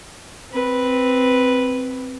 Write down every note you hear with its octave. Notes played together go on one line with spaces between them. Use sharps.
C4 B4